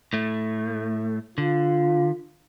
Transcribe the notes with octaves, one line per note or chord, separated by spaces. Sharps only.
A2 A3
D3 F4